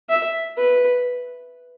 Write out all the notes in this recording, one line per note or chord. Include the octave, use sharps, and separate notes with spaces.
E5
B4